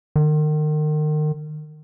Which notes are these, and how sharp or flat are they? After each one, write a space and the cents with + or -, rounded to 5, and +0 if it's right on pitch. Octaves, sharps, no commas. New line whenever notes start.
D#3 -35